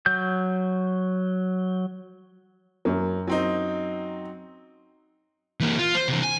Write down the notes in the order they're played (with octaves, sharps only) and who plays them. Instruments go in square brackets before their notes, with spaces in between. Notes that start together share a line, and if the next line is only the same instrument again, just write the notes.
[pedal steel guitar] F#3 G6
[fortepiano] F#2 A#3 [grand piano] F#3
[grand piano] F#3 C4 D#4
[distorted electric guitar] E3 A#3
F4
C5
C3 E3
G#5